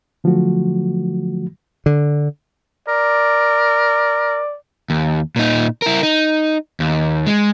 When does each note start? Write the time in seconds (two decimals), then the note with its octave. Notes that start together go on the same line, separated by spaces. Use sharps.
0.24 D3 F3 F#3 A3 F#4
1.86 D3
2.88 A#4 D5
4.90 D#2
5.36 A#2 D#4
5.82 E4 A#4
6.03 D#4
6.80 D#2
7.27 G#3